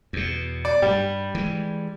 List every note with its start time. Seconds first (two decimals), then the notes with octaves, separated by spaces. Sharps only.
0.13 E2 B2
0.65 D5
0.82 G2 G3
1.35 E3 G#3